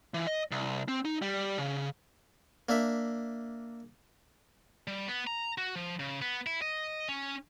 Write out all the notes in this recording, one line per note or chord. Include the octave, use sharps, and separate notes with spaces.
E3
D#5
C2
C4
D#4
G3
C#3
A#3 D4 E5
G3
B3
A#5
F#4
F3
C#3
B3
E4
D#5
C#4